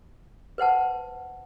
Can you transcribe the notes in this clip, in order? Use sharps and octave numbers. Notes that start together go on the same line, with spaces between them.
B4 C5 F#5 A5